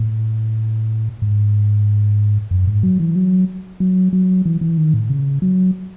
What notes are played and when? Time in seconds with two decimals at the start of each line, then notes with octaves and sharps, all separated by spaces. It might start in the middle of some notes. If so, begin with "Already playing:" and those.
Already playing: A2
1.22 G#2
2.51 F#2
2.67 G#2
2.83 F#3
3.00 E3
3.16 F#3
3.80 F#3
4.13 F#3
4.45 E3
4.61 E3
4.78 D#3
4.94 A2
5.10 C#3
5.42 F#3